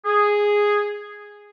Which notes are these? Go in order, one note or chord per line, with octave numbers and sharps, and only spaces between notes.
G#4